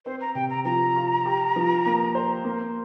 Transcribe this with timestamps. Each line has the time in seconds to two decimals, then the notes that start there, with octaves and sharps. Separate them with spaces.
0.05 C4 C5
0.21 A#5
0.35 C3 G5
0.50 A#5
0.65 F3 A#5
0.96 F4
1.26 G4
1.56 F3
1.86 A#3
2.15 C5
2.45 A#3